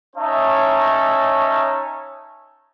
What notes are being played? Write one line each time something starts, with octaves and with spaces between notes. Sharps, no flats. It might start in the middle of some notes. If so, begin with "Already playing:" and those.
C#4 D#4 C#5 E5 A5